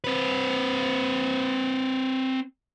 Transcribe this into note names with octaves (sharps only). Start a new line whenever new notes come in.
C4 B4